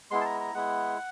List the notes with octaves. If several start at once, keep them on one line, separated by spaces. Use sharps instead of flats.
G#3 B3 E4 C6
A5
A#5
A#5
G#3 B3 E4 F#5